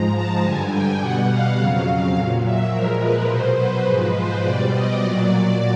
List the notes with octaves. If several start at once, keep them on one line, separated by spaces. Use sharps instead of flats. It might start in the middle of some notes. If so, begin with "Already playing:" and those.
Already playing: G#2 F3 G#3 A#5
A5
G2 D3 G3 G#5
G5
B2 G3 F#5
F5
F2 C#3 F#3
A#2 F#3
E5
A#2 F3 G#3 A#4
B4
B2 F#3 C5
B4
G#2 F3 G#3 B4
C5
B2 G3 D5
D#5
A#2 F#3 D5